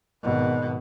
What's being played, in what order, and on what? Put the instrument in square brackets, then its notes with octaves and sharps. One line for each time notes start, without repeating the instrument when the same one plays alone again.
[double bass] G#1 B2